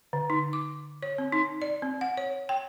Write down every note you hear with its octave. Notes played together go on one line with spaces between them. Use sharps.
D3
D#4
D6
C#5
C4
D#4
D5
C4
F#5
C#5
G5